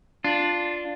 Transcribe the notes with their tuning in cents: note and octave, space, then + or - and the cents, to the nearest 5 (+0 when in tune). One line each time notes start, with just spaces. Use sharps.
D4 +0 F4 +0